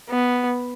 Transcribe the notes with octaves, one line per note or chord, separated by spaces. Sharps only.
B3